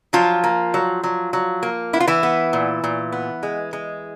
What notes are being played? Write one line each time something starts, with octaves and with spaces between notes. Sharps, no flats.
F3 F#3 F4
A#3
F#3
F#3
F#3
A#3
B3 E4
F4
E3 E4
B3
A#2
A#2
B3
G#3
G#3